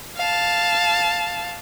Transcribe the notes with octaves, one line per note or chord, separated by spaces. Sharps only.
F5 A5